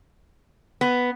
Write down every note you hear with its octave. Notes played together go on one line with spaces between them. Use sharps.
B3